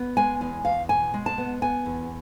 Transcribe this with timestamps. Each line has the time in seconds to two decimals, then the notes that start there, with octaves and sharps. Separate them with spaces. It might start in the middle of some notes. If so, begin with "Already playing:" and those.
Already playing: B3
0.17 G#3 G#5
0.41 E2 G#5
0.65 E2 F5
0.89 B2 G#5
1.14 G#3
1.26 A5
1.38 B3
1.62 B3 G#5
1.86 E2